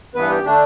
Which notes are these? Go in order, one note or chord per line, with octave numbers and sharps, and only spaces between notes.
G2 E3 B3 B4
G4
D3 A3 D4